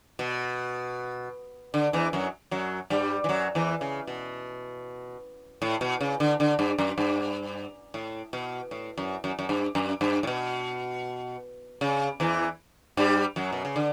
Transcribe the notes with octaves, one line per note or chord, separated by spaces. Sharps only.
B2
D3
E2 E3
F#2 F#3
F#2 F#3
G2 G3
E3
F#2 F#3
E2 E3
C#3
B2
A2
B2
C#3
D3
D3
G2
F#2
G2
A2
B2
A2
F#2
F#2
F#2
G2
F#2
G2
A2
B2
C#3
E2 E3
G2 G3
F#2 F#3
B2
C#3
D3